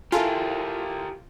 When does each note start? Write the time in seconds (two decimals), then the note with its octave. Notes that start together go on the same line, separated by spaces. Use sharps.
0.12 E4 F4 G4 A4 A#4 G#5